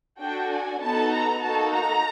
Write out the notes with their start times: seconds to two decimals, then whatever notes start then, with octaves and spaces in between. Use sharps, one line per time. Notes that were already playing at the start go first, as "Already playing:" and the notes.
0.20 D4 F#4 A4 G5
0.51 G#5
0.81 B3 D#4 F#4 A4 A5
1.12 A#5
1.42 A#3 D#4 F#4 A4 A5
1.73 A#5